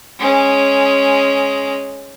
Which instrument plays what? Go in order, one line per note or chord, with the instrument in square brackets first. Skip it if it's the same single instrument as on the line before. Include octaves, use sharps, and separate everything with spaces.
[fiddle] G#3 C#4